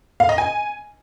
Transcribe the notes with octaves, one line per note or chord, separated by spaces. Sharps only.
F5
D#5
G#5